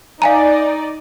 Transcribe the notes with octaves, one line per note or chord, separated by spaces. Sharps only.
D#4 D5 F5 G#5 A#5